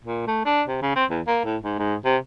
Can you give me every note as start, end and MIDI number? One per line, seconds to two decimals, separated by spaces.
0.04 0.23 46
0.27 0.40 57
0.45 0.62 62
0.68 0.79 48
0.82 0.92 49
0.96 1.05 60
1.10 1.21 40
1.27 1.41 58
1.45 1.57 45
1.64 1.77 44
1.79 1.95 44
2.05 2.17 48